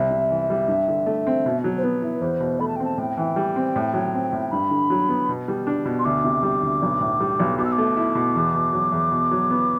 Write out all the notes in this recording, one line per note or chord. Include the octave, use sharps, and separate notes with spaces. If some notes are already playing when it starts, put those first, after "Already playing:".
Already playing: C2 C4 E5
C3
E3
G3
G2
D3
A3
C4
B2
F#3
C5
B3 B4
E4
E2 C5
B2
A3 B5
A5
G5
C4 A5
A2 G5
E3
G3
C4
A2
F#3
C4
A2
G2 B5
D3
F#3
B3
B2
G3
D4
B2
C6
D2 D6
C3
G3
D2
B1
A2
G3
B1
B2 D6
E6
D6
A3
E4
B2
E2
B2
F#3
E2
B2
F#3
B3